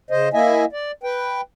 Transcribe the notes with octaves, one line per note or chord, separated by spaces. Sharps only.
C#3 C5 D#5
A#3 E4 D#5 E5 G#5
D5
B4 G5